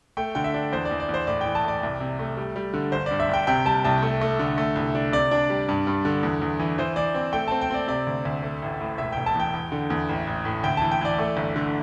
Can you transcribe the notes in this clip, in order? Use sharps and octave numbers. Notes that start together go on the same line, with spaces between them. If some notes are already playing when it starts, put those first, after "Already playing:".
A3 G5
D3 G5
E5
D4
E2 C5
D5
E2
D5
E2
C5
A2 D5
G5
E3
A5
A2 D5
C2
C3
A3
G3
G3
D3
G1 C5
G2 D5
E5
G1 G5
C3 G5
G3 A5
C2 A5
A3
A3
D3
A3
C2
D4
C3 D5
D4
G3
G2
G2
D3
E2
E2
E3
E3 C5
E3 D5
C4
A3 G5
C4 A5
G5
C4 D5
C3 D5
D2
D2
A3
A1
A2
E1 E5
E1 G5
A5
E2 G5
E2
D3
E2
A1
A1
A2
D2 G5
E3 A5
G5
E3 D5
A3
G1
D3